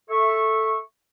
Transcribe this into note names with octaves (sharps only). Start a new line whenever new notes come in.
A4 E5 C#6